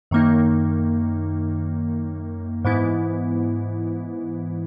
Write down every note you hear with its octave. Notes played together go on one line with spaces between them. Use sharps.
F#2 D#3 A#3 D#4
G#2 E3 B3 E4